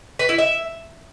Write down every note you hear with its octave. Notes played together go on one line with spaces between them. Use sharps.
B4
E4
E5